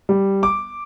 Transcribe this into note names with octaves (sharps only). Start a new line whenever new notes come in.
G3
D6